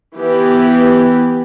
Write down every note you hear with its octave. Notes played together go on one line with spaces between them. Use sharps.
E3 B3 G4